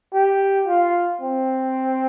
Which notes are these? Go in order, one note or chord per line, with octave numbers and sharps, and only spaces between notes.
G4
F4
C4